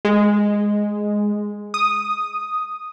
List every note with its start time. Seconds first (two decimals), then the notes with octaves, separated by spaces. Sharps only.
0.05 G#3
1.74 D#6